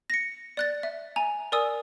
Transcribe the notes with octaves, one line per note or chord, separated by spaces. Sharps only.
A#6 C#7
D5 F#6 A6
E5
G#5 A#5
A#4 D5 G#5 D#6 E6